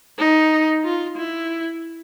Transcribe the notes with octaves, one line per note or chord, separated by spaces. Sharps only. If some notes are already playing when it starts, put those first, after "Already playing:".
D#4
F4
E4